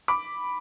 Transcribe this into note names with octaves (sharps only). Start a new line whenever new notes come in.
B5 D6